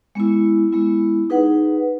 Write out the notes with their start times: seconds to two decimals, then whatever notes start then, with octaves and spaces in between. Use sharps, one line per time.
0.15 G#3 B3 E4
0.72 G#3 B3 E4
1.30 D#4 G#4 B4 F#5